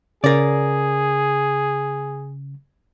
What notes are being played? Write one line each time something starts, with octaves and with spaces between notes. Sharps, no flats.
C#3 G#4 A#4 D5